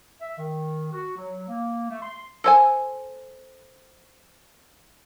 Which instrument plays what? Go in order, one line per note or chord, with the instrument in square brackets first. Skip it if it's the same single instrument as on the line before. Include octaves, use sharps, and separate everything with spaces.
[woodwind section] E5
D#3
F#4
F#3
A#3
A3
C6
[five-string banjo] A4 C5 G#5